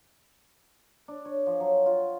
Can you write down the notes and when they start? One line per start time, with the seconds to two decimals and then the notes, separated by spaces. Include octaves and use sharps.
1.08 D4
1.25 C#5
1.46 F3
1.60 F#3
1.86 F4